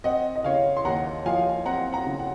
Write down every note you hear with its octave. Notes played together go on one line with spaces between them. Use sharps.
C4 D#5 F#5
D#5
C#3 C#5 F5
C6
D#2 F#5 A#5
F3 F5 G#5
C4 F#5 A#5
F#5 A#5
C#3
F#5